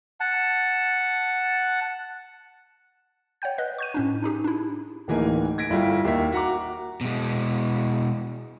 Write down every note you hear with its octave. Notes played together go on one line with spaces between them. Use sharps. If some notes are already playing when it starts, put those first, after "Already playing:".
F#5 A5
C#5 F#5 G5 G6
B4 D#5 F#6
C#6 G6 D#7
A2 C#4 D4
D4 D#4 G4 G#4
D4 E4
D1 E3 A#3 D#4 G#5
G#6 A#6 B6 D7
G1 E4 F4 A4 G5
D#2 A#3 E5 B6
F#4 F#5 A#5 D6
B2 G#3